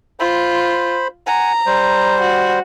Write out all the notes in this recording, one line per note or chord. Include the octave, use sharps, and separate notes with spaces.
F4 C5 B5
F#5 G#5 A#5
G3 C5
F#4